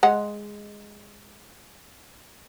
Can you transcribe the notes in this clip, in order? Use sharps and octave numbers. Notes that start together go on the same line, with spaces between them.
G#3 F#5